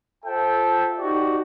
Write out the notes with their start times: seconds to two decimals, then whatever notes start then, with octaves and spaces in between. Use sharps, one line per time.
0.25 F4 A4 C5 E5 G5
0.99 D#4 F#4 G4 D5